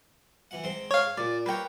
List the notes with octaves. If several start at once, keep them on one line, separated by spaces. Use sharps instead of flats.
E3 F#5
G#2 C4 C6
C#5 F5
A#2 D5
A#3 A#4 B4 C#5 G5